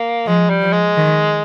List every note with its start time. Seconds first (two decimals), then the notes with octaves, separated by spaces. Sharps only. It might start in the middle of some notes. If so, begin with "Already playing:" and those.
Already playing: A#3
0.26 F3 G#3
0.50 G3
0.62 F3
0.73 G#3
0.97 D#3